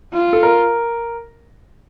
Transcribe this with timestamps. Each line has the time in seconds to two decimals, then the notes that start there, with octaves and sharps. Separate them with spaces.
0.13 F4
0.33 A4
0.43 A#4